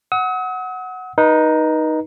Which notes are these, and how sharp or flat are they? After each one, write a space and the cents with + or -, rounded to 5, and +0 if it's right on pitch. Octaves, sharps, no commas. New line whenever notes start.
F#5 +0 D#6 +45
D#4 +0 B4 -35